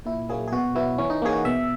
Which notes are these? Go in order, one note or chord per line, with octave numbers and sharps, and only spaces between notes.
A#2 E4
F#3 A#3 C#4 G#4
G#4
B2 F#4
F#3 B3 E4
E3 C#4
D#4
A#3 C#4 G#4
F#4
B2 E5